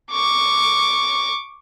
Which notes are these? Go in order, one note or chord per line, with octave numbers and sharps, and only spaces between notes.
C#6 D6